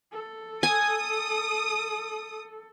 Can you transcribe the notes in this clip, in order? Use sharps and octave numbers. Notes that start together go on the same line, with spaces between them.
A4
G#5 D#6